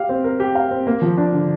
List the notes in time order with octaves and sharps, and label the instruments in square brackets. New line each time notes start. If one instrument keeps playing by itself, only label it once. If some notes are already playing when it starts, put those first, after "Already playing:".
Already playing: [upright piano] G4 F5
C4
A#4
G4
F5
C4
A#3
F3
D4
D3